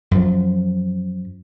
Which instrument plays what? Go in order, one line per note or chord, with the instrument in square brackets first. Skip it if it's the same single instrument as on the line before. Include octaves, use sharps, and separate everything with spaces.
[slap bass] F#2 F3